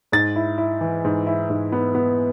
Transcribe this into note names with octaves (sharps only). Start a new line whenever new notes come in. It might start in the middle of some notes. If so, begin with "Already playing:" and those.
G#2 A6
E4
E4
E3
G#2
E4
G#2
B3
B3